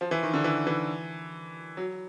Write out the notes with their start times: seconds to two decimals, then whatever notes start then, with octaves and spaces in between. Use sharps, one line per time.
0.01 F3
0.11 E3
0.23 D#3
0.33 D3
0.44 E3
0.67 E3
1.77 F#3